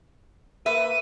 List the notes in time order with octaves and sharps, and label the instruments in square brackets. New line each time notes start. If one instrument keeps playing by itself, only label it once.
[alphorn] A#3 [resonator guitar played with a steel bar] B4 E5 [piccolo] D#7